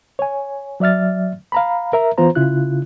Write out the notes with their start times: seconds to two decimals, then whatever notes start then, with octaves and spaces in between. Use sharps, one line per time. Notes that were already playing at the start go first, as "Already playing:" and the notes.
0.19 C#5 G#5
0.80 F#3 D5 E5 F6 A6
1.52 F5 A#5 B5
1.93 A#4 E5 A#5
2.18 E3 B3 F4 C5 A#5
2.35 C#3 E4 F4 F#6